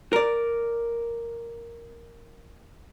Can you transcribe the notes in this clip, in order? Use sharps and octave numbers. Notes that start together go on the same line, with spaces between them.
A#4 D5